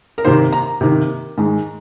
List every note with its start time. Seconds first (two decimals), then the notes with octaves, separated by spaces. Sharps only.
0.18 A#4
0.25 C3 D#3 A#3 C5
0.53 A#5
0.81 C3 D#3 A#3
1.38 G#2 D#3 G#3